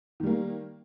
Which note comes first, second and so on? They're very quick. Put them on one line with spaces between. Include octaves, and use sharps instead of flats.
D#3 G3 A#3